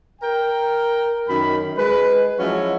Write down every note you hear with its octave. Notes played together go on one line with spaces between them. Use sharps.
A#4 G5
F#2 D#3 B5
G#3 B4
F3 F#3 G#3 C#4 E4 F#4